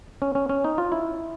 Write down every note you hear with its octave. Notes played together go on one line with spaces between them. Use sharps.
C#4
C#4
C#4
D#4
F4
E4